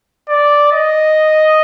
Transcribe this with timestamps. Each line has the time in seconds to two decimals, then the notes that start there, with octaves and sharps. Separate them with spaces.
0.29 D5
0.72 D#5